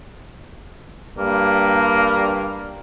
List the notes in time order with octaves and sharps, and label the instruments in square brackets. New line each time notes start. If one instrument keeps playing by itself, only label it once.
[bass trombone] G2 [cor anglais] A#3